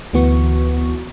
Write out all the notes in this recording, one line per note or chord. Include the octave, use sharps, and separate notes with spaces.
D2 E3 B3 F#4 C#6